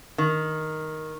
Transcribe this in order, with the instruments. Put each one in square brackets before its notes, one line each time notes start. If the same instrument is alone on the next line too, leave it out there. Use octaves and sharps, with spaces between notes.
[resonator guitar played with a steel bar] D#3